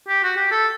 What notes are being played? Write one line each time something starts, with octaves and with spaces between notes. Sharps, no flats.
G4
F#4
G4
A4